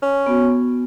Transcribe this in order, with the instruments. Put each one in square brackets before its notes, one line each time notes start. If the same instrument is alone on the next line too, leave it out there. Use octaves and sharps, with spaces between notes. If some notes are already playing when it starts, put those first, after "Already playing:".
[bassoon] C#4
[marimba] B3 F#4